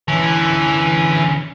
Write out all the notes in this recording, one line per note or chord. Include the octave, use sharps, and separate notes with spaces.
D3 E3 C#4